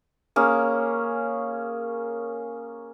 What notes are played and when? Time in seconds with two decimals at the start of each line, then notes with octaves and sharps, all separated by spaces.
0.36 A#3 C#4 G#4